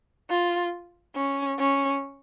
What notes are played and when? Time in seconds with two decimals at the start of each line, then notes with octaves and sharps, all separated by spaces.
0.30 F4
1.16 C#4
1.59 C#4